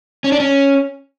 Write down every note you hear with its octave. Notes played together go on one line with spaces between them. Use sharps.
C#4
D4
C#4